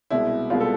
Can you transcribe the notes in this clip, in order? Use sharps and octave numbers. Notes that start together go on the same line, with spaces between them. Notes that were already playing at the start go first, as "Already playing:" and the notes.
C2 B2 G#3 E4
C2 B2 G#3 F4
A4